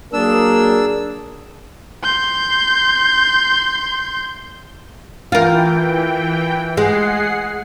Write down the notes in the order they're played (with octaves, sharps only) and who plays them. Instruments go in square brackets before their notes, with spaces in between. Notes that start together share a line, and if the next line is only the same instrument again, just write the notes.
[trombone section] F#3 A#3 A#4 [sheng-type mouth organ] D4 E6 [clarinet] G#4
[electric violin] C6 G6
[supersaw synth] E3 G5 [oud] F4 A#4
[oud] G#3 [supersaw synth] G#4 F#5 C7